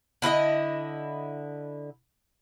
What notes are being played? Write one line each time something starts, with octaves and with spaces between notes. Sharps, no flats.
D3 E4 B4 D#5